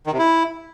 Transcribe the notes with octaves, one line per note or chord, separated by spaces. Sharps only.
D#3
C3
E4